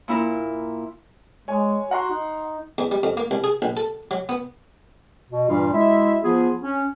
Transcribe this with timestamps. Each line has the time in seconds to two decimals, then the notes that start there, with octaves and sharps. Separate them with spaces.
0.08 A#2 E4 A#4
1.48 G#3 C#5 G#5
1.91 F#4 F#5 A#5 C6
2.11 D#4
2.78 E2
2.91 G3
3.03 F2
3.17 A#3
3.31 C2
3.44 G#4
3.62 A#1
3.77 A4
4.11 F#3
4.29 B3
5.30 B2
5.49 G2 A#2 E3 G3 F4
5.74 G#3 E4 F#4 E5
6.24 F3 B3 F4 G#4
6.63 C#4